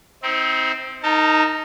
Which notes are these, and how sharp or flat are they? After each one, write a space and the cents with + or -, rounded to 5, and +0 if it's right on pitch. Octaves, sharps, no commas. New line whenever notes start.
C4 +0 D#4 +40
D#4 +0 A#4 -30 A5 +5